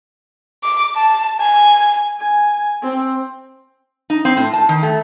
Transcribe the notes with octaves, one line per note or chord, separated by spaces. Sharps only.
D6
A5
G#5
G#5
C4
D#4
C4
A2
A5
D#3
A3